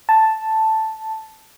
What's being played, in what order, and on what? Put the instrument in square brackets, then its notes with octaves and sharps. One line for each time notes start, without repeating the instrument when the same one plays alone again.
[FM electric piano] A5